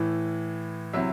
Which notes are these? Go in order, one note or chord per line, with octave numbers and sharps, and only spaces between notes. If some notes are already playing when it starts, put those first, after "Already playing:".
Already playing: A2 E3
C3 F#3 E4 E5